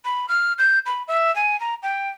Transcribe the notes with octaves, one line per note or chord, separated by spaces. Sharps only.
B5
F6
G6
B5
E5
G#5
A#5
G5